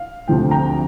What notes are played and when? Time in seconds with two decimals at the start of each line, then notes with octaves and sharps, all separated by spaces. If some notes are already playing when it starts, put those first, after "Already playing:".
Already playing: F5
0.28 D2 C3 F3 A3 G5
0.51 G5 A#5